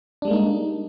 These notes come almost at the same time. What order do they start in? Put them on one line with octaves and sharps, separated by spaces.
D4 G3 G#3 A#3 D#4